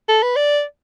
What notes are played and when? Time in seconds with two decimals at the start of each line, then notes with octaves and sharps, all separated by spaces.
0.08 A4
0.22 B4
0.36 D5